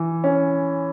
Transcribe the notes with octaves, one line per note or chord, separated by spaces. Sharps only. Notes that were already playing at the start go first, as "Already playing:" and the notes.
Already playing: E3
C#4